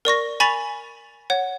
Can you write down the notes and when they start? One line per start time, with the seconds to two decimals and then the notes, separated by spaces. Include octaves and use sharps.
0.05 A#4 D5 C#6 A#6
0.40 G#5 B5 C#6 A6 B6 F7
1.30 C#5 F#5